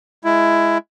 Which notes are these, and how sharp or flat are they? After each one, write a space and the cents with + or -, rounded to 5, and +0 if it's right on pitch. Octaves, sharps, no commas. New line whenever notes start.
G#3 +10 E4 +15